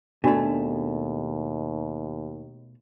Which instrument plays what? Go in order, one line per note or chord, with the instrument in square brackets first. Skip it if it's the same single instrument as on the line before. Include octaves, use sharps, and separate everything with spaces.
[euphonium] D#2 [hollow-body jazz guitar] B2 A3 [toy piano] D4 F#4 D5